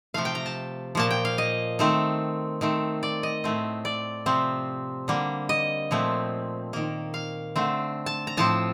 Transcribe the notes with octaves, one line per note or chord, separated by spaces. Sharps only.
C3 F3 A3 F5
G5
A#5
A5
A#2 F3 A#3 A5
G5
F5
D#5
D#3 A3 C4
D#3 A3 C4
D5
D#5
A2 A3 C4
D5
C3 F3 C4
D3 G3 A#3
D#5
A#2 F3 A3 C4
D#3 A#3
F5
D3 A3 C4
A5
A#5
A2 F3 C4 A5